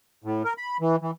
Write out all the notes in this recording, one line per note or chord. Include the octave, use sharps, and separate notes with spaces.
A2
A#4
B5
E3
E3